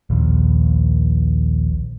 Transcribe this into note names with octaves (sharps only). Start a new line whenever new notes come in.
A#1 D#2